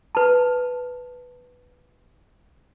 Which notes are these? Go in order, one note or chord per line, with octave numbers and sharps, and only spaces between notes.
B4 A5